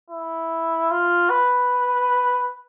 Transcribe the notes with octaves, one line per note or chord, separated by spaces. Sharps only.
E4
F4
B4